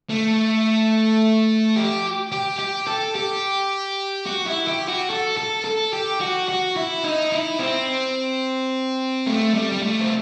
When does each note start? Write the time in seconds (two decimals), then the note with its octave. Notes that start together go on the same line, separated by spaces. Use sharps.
0.09 A3
1.76 G4
2.32 G4
2.59 G4
2.87 A4
3.15 G4
4.26 F#4
4.46 E4
4.67 G4
4.88 F#4
5.10 A4
5.38 A4
5.65 A4
5.93 G4
6.20 F#4
6.48 F#4
6.76 E4
7.04 D#4
7.32 E4
7.59 C4
9.26 A3
9.54 G3
9.72 G3
9.82 A3
10.00 C4